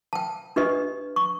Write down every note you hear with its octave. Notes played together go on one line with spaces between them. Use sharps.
G5 A5
D4 G4 B4 D#5
C#6